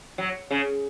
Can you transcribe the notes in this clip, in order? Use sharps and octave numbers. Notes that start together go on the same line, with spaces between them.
F#3
C#3